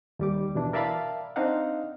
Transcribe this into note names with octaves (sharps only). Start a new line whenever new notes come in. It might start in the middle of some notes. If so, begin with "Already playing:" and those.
D#2 G3 D6
B2 E3 D4
A#4 D5 E5 F5 A5 B5
C4 D4 D#4 D#5 F5 F#5